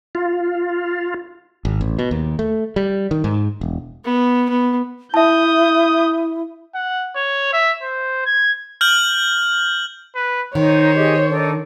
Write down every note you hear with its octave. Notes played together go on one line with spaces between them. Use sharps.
F4
G#1
A1
B2
D#2
A3
G3
D#3
G#2
E1
B3
B3
E4 E5 A5 D#6 G6
F#5
C#5
E5
C5
G#6
F6 G6 F#7
B4
D#3 D#4 C5 C#5
G4 G#4 D#5
D4 D#4 A4